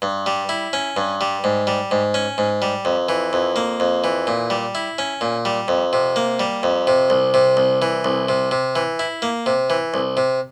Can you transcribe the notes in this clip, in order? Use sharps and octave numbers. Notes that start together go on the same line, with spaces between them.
G2
G3
E4
C#4
G2
G3
G#2
G3
G#2
C#4
G#2
G3
F2
E3
F2
A#3
F2
E3
A#2
G3
E4
C#4
A#2
G3
F2
C3
A#3
G3
F2
C3
C2
C3
C2
E3
C2
C3
C3
E3
E4
A#3
C3
E3
C2
C3